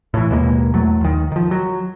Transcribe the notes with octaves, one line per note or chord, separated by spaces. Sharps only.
A2 E3
D#2 B2 G#3 A#3
E2 F#3 A3
D#2 D#3
D#3 F3
F#3